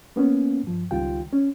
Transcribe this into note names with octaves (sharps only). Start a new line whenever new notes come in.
A#3 B3 C#4
G2 F3
C#2 D#3 G3 F4 G5
C#4